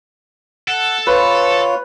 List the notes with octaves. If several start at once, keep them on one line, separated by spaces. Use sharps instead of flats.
A4 F#5
F4 B4 C#5